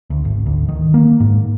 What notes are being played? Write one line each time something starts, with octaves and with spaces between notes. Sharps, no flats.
D2
G#1
D2
D#3
A#3
G#2